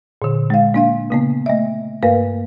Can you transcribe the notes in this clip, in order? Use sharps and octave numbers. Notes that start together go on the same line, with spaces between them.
A#2 D3
G#3 F5
A#3 D4 F5
C#3 A#3 B3
A3 D#5 E5
G2 A#3 A#4 B4 F5